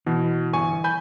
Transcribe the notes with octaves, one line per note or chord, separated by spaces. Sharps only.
B2 E3
G1 G#5 C#6
G#5 B5 G6